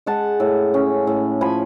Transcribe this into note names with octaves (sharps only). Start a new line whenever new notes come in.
G#3 F#5 A5
A2
C#4
A2
F3 G#5 B5